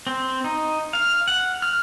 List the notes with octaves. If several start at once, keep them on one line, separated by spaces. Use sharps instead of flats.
C4
D#4
F5
F#5
F6